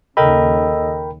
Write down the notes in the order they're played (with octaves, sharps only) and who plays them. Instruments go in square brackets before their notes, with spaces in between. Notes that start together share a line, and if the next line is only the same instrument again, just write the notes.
[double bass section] D#2 C#3 [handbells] A4 D#5 [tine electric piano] A#4 G5 B5